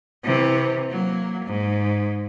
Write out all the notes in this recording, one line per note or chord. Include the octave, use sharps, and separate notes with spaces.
C3 E3
F#3 A#3
G#2